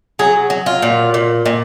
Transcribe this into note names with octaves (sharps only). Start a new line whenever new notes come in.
F#3 G#4
F#3
F4
A#2
A#2
A#2